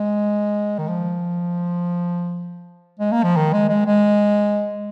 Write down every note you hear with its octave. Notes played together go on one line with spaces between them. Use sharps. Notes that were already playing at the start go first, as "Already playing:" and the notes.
Already playing: G#3
D#3
F3
G#3
A#3
F3
D#3
G#3
G#3
G#3